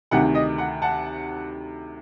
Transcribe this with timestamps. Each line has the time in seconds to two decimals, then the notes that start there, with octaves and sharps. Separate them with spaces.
0.11 D2 C3 D#3 F#5
0.35 D#5
0.58 F#5
0.82 F#5 A5